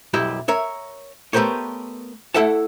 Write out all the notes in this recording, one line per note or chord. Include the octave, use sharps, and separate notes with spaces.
B1 F#2 G3 E4 G4 D#5
A#4 C#5 E5
A3 B3 G4 A#4 C5 C#5
A3 E4 A4 E5 F#5 A5